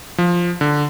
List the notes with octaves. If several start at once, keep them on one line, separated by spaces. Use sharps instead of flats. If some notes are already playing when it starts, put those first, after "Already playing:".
F3
D3